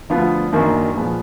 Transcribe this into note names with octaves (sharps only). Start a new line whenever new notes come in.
D2 D3 F3 B3 F4
F#1 F#2 D#3 A#3 D4
A#2 F3 G#3 B3